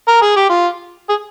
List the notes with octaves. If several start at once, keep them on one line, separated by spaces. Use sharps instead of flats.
A#4
G#4
G4
F4
G#4